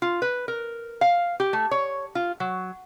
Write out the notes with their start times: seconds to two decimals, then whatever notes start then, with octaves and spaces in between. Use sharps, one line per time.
0.02 F4
0.22 B4
0.48 A#4
1.01 F5
1.40 G4
1.53 A3
1.71 C#5
2.15 F4
2.40 F#3